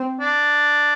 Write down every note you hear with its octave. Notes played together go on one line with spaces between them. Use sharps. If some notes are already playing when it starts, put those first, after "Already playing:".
Already playing: C4
D4